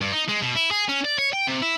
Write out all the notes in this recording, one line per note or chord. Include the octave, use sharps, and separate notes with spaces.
G2
D#4
G#3
B2
E4
G#4
C#4
D5
C#5
G5
C3
E4